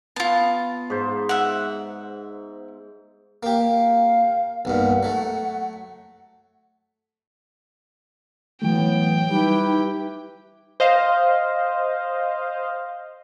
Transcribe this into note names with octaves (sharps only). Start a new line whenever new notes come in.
B3 F4 A5
G#2 C5
E5 F#5
A#3 G4
F5
B1 G2 A#2 F#5
F#3 A3
A2 E3 F#3 A3 B3 G5
G3 D#4 E4 G4 B4
C5 D#5 F5